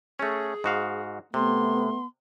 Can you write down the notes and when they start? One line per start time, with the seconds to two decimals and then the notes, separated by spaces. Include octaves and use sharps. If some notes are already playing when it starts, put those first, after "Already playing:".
0.19 A3 C#4 G#4
0.64 G#2 F#4 F5
1.34 C3 A3 B3 C6